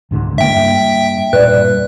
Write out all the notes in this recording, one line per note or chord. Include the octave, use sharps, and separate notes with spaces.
C#2 G#2 D3
G2 A#3 E5 G5
E1 G2 A#2 B4 D5 F#6